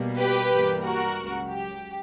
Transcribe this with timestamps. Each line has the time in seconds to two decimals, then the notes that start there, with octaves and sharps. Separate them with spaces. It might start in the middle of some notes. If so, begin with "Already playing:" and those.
Already playing: B2 G3 A#3
0.18 G4 B4
0.51 G2 E3 G3 A#3
0.83 F#4 A#4
1.17 C#2 C#3 F#3
1.50 G4